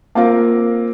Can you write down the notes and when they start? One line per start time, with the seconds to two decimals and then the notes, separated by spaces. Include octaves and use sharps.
0.15 A#3 C4 F4 A#4